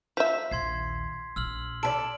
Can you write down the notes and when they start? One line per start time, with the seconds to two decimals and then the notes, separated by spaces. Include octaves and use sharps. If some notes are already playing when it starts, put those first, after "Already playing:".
0.17 F3 E5 B6
0.51 A#1 D#2 C6 G#6 C7
1.36 A#1 E6 F6 F#7
1.83 A4 B4 D5 D7 F#7